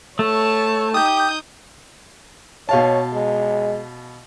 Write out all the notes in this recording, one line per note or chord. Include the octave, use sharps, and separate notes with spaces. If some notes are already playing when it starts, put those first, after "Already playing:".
A3 C#5 A5
D#4 G4 D#6 G6
B2 C#5 F5 A5
G#3